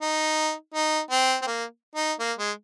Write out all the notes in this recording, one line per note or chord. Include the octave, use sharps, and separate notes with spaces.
D#4
D#4
C4
C4
A#3
D#4
A#3
G#3